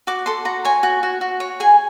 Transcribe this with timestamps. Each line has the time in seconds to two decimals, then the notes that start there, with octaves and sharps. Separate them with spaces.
0.07 F#4 D6
0.26 A4 C6
0.45 F#4 A#5
0.65 C#5 G#5
0.83 F#4
1.03 F#4
1.21 F#4
1.40 C#5
1.60 G#4 G#5